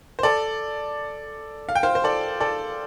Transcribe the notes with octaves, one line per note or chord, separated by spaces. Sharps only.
C5
A4 D5
F5
G5
C5 F5
C5
A4 D5
A4 D5